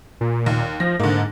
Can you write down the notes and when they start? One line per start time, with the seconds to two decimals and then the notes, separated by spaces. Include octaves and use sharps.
0.21 A#2
0.46 D#2
0.80 F3 A#6
1.00 G#2 D3 A#3